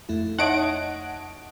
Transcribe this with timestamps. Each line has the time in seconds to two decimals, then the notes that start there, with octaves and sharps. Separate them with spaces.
0.09 F2 A3 E4
0.39 F2 D#4 C#5 D#5 E5 F#5 A5 D7